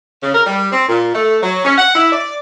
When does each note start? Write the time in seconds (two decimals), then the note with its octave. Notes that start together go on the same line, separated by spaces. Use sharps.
0.22 C#3
0.34 A#4
0.46 G3
0.72 C4
0.89 A#2
1.15 A3
1.43 F#3
1.65 C#4
1.78 F#5
1.95 E4
2.12 D5